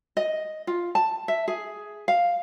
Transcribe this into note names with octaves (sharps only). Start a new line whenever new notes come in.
D#5
F4
A5
E5
G#4
F5